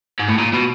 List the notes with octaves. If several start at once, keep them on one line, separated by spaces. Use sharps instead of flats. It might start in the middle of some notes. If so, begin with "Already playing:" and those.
G#2
A2
A#2
B2